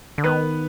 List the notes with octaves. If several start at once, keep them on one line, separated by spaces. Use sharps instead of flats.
D3
D#3 B3 B4